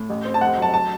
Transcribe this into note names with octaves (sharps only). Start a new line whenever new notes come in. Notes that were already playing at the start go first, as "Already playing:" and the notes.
Already playing: A2
A1
C4
A5
F1 F#5
F#3 A5
A5